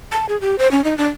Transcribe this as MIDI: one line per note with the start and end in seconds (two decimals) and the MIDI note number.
0.12 0.25 81
0.29 0.39 68
0.41 0.56 67
0.59 0.70 72
0.71 0.84 61
0.84 0.97 63
0.98 1.08 62